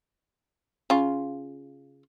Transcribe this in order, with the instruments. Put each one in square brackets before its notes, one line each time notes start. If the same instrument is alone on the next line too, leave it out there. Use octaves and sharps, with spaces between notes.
[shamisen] C#3 F4